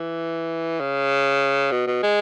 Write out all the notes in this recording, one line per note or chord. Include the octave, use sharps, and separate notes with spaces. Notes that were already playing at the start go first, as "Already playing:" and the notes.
Already playing: E3
C#3
B2
B2
G#3